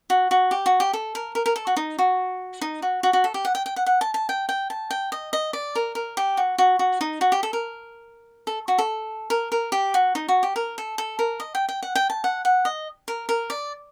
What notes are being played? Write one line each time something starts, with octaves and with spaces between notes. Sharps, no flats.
F#4
F#4
G4
F#4
G4
A4
A#4
A#4
A#4
A4
F#4
D#4
F#4
D#4
F#4
F#4
F#4
A4
G4
F#5
G5
G5
F#5
F#5
A5
A5
G5
G5
A5
G5
D#5
D#5
D5
A#4
A#4
G4
F#4
F#4
F#4
D#4
F#4
G4
A4
A#4
A4
F#4
A4
A#4
A#4
G4
F#4
D#4
F#4
G4
A#4
A4
A4
A#4
D#5
G5
G5
F#5
G5
A5
F#5
F#5
D#5
A#4
A#4
D5